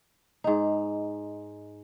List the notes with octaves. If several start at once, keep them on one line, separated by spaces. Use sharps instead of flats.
G#2 D#4